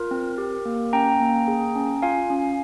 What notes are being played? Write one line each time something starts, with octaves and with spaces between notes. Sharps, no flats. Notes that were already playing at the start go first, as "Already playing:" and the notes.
Already playing: F4 A#4
C4
G4
A#3
C#4 G5 A#5
A#3
G#4
C#4
F4 F5 G#5
C#4